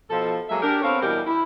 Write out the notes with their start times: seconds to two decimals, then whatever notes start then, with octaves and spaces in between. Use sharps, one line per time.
0.10 B2 F3 F4 A4
0.49 F#3 G#3 A#3 E5
0.62 D4 G4 A#4
0.82 B3 C4 A4 A#4 C#5 F5
1.01 B2 E3 G3 G4 A#4
1.26 E4